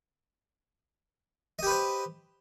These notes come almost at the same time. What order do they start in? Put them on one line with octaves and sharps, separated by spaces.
D#5 G4 B4 C5